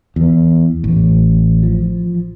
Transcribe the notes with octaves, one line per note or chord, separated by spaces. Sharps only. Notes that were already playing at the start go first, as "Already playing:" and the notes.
E2
A1
F3